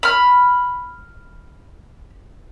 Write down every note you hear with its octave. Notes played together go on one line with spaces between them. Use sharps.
B5 F6